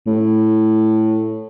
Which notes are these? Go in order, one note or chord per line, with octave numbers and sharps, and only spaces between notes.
A2